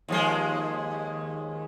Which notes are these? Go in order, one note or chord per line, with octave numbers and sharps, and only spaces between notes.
D#2 F3 G#3